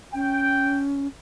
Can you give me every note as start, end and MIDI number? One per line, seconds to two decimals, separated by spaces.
0.14 1.07 61
0.14 0.82 79